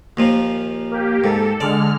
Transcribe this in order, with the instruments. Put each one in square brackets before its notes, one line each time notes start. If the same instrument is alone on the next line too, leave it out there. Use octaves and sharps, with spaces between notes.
[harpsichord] D#2 A#2 F3
[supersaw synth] A#3 G4
[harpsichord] G#2 [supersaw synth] A4
[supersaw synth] D3 G#3 F6 [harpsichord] D5